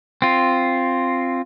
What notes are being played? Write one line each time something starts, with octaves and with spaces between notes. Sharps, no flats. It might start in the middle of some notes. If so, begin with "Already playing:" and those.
C4 F4